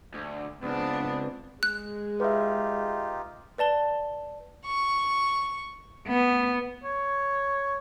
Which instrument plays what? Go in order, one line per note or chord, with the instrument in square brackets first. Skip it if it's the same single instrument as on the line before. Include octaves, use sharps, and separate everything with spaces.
[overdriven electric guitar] D2
[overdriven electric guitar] C#2 [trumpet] B3 [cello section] C4 D4
[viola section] G#3 [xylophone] F#6
[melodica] D#4 F4 G4 [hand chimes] B4 E5
[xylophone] B4 D5 A5 G7
[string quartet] C#6
B3
[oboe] C#5